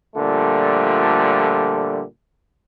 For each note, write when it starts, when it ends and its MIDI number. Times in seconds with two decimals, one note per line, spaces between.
0.16 2.02 46
0.16 2.02 50
0.16 2.02 53
0.16 2.02 55
0.16 2.02 57